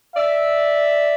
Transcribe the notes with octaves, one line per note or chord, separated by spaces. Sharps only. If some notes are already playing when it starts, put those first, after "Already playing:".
D5 E5